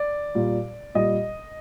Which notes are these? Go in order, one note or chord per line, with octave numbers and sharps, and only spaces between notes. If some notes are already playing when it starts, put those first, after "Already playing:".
Already playing: D5
A#2 G3
A#2 G3 D#5